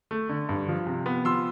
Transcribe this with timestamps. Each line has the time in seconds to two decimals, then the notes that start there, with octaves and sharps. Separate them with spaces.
0.11 A3
0.29 D3
0.49 G2
0.68 F3
0.87 C3
1.06 B3
1.25 F3 C6 E6